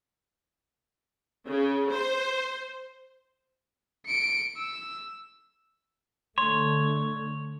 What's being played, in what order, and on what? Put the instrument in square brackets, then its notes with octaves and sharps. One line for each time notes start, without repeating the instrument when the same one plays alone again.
[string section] C#3
C5
[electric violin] C#7 D7
E6
[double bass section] D3 A3 [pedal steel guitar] C#5 [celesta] C6